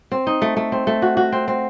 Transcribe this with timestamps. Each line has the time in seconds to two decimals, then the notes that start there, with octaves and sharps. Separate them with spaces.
0.12 C4
0.27 D#4
0.42 A3
0.57 A3
0.72 C4
0.87 A3
1.02 F#4
1.17 F#4
1.32 C4
1.48 C4